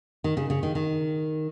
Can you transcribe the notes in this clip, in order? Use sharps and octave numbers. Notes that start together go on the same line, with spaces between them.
D#3
C#3
C#3
D#3
D#3